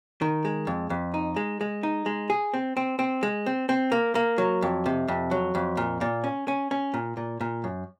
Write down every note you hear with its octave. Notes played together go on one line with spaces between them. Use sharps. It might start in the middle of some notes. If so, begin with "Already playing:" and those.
D#3
G#3
F2
F2
D#4
G#3
G#3
D#4
G#3
G#4
C4
C4
C4
G#3
C4
C4
A#3
A#3
F#3
F2
C3
F2
F#3
F2
A#2
A#2
C#4
C#4
C#4
A#2
A#2
A#2
F#2